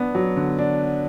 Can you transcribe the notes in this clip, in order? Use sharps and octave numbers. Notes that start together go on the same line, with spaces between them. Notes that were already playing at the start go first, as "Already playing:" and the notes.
Already playing: B3 D4
F#3
D3
D4